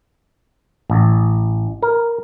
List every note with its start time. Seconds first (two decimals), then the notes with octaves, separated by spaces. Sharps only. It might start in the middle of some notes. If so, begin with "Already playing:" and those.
0.90 A1
1.83 A#4